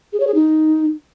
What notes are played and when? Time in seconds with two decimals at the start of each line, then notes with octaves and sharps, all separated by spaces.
0.13 G#4
0.20 C#5
0.27 G#4
0.35 D#4